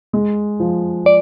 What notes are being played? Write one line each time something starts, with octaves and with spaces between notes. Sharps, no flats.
G#3
F3
D5